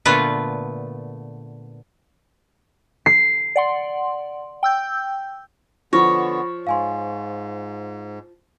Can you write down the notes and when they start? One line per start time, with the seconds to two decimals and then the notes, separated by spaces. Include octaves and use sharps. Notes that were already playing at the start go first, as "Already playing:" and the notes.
0.05 A#2 D3 A3 B3 F4 B4
3.06 C7
3.56 D5 F#5 C6
4.63 G5 E6 G6
5.93 D3 F3 B3 C#5 B5 A#6
6.67 G#2 F5 G#5 C6